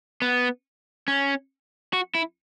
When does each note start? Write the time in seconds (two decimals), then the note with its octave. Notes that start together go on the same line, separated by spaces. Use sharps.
0.22 B3
1.08 C#4
1.93 F#4
2.15 E4